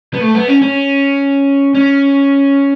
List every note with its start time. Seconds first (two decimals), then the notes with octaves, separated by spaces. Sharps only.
0.14 B3
0.21 A3
0.35 B3
0.48 C#4
0.62 C#4
1.75 C#4